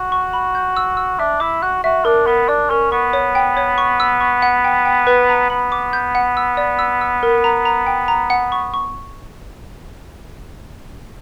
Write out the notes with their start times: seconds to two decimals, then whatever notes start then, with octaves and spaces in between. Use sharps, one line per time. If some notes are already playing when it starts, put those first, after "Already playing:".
Already playing: F#4
0.12 C#6
0.33 B5
0.55 G6
0.77 E6
0.97 E6
1.19 D4 E5
1.40 E4 D6
1.62 F#4 F#6
1.83 F#4 E5
2.05 D4 A#4
2.27 B3 A#4
2.49 D4 D5
2.70 C#4 A#4
2.91 B3 C#6
3.13 C#5
3.35 G5
3.57 C#5
3.78 C#6
4.00 E6
4.21 C#6
4.42 F#5
4.64 G5
4.85 G5
5.07 B4
5.29 A#5
5.50 B3 B5
5.72 D6
5.93 G6
6.15 F#5
6.37 E6
6.57 D5
6.79 E6
7.01 E6
7.23 A#4
7.44 A#5
7.65 A#5
7.87 G5
8.08 A#5
8.30 F#5
8.52 C#6
8.74 C#6